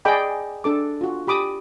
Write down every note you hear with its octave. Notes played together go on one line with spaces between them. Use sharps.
G#4 D5 D#5 G5 B5 D6
D4 A4 D6
F4 F#4
G4 B5 D6 D#6